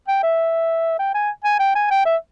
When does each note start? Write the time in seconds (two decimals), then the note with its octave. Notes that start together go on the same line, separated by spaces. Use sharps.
0.08 G5
0.23 E5
0.99 G5
1.14 G#5
1.44 G#5
1.59 G5
1.75 G#5
1.91 G5
2.06 E5